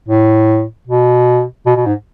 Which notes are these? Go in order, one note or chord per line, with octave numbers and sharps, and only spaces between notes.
A2
B2
B2
B2
G#2